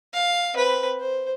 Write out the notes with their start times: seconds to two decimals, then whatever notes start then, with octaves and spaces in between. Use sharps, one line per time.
0.13 F5
0.54 C4 B4
1.00 C5